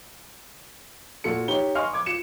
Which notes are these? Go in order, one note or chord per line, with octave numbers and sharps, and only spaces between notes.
A#2 F4 F#4 A4 C#7
D#4 G4 C#5 G7
D#5 F5 G#5 C6 C#6 F6
D6 G#6
F4 C#7 E7